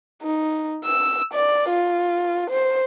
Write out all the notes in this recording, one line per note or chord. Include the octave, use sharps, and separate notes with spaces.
D#4
E6
D5
F4
C5